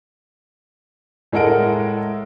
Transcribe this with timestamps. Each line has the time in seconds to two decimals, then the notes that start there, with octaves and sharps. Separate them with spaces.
1.32 A2 G#3 A4 A#4 F#5 D7